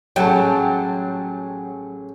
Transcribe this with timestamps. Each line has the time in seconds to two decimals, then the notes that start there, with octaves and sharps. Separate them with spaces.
0.16 A1 F#3 G#4 G5 A5